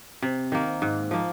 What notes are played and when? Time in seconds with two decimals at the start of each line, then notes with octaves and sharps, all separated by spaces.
0.22 C3
0.52 D#3 A#3
0.82 G#2
1.11 F3 A#3